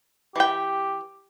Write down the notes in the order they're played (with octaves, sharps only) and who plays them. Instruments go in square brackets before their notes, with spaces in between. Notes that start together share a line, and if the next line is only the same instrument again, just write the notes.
[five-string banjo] E3 G5 [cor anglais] G4